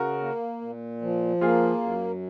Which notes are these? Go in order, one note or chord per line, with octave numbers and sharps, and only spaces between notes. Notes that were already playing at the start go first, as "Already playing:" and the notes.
Already playing: C#3 F#4 A#4
A#3
A#2
F3
A#3 F4 G#4
F#2